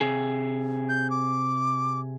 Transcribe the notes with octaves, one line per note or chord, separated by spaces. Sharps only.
C3 G#4
G6
D6